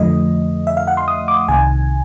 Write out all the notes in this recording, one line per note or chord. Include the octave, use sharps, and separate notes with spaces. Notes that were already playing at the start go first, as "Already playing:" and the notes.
Already playing: F2 D3 F3 A3 D#5
E5
F5
F#5
C6
D#6
D6
C2 C3 D#3 G#5